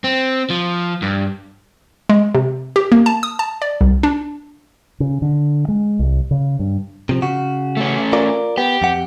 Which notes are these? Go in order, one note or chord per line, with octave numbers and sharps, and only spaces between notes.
C4
F3
G2
G#3
C3
G4
A#3
A5
D#6
A5
D5
C2
D4
C#3
D3
G#3
C2
C#3
G2
C3 F3
C#3 F#4
A3 C#4
F4 A#4 D5
B3 G4
F2 F#5